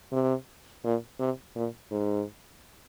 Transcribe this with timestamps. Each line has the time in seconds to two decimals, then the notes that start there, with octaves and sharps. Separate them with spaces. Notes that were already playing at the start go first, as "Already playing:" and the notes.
0.12 C3
0.84 A#2
1.20 C3
1.56 A#2
1.91 G#2